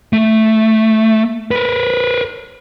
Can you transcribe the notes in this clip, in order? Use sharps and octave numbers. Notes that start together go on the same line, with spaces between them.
A3
A#4 B4